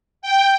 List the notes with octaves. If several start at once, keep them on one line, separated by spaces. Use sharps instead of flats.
G5